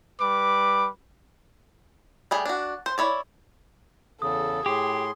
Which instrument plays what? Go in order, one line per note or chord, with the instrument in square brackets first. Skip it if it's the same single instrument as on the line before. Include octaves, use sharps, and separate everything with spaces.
[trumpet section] G3 B4 B5 D6
[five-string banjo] G3 A3 G#4
D4 F#4
C5
E4 C#5 D5
[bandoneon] E2 C#3 [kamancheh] A4 [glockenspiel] D#6
[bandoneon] A2 C6 [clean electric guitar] G4 [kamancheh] G#4